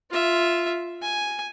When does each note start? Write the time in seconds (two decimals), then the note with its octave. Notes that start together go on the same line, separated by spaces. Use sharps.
0.11 F4 E5
1.02 G#5